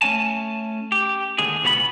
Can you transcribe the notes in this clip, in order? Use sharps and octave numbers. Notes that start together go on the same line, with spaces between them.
A3 C#4 G#5 A5
G4
D#2 D3 G#3 G#4
C#2 B2 B3 D#5 B5